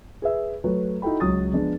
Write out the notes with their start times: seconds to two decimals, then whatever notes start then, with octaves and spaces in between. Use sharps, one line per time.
0.22 G#4 B4 E5
0.64 F#3 A3 B4
1.02 D#4 E4 F#4 A4 G5 B5
1.20 C#2 F#3 D#6 A6
1.53 F3 G#3 B3 D4